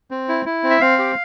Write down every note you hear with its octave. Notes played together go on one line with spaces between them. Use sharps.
C4
E4
E4
C4
E5
C4 F5
G4